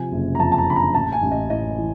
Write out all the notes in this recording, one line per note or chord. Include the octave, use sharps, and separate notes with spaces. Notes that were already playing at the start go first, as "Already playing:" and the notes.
Already playing: C3 F3 G#5
F#1
A#5
F2 A5
A5
A#5
D3 B5
A#5
A1 A5
G#5
A1
D#5
A2 D#5
E3